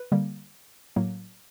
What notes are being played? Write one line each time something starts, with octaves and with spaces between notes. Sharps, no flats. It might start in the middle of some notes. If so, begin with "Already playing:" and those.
Already playing: B4
D3 G3 A#3
A2 F#3 A#3